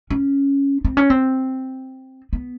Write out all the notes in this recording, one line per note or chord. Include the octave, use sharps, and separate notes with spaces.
C#4
C4
C#4
C4
B3